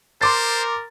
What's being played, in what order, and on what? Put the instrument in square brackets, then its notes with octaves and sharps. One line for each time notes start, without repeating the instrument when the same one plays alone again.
[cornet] A#4 [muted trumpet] C5 [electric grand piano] C6 D6 A6